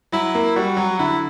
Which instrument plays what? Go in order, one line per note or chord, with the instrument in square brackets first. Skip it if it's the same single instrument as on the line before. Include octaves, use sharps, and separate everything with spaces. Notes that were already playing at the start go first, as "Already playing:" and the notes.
[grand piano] F#3 [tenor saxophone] E4
[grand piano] A#3
[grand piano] G3 [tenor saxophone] F#4
[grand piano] F#3
[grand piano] D3 [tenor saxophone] E4